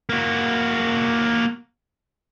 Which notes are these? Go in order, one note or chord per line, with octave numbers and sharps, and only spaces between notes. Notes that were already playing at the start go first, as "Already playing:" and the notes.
A#3 F#4